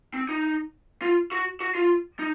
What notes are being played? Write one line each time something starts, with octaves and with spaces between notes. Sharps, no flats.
C4
D#4
F4
F#4
F#4
F4
D#4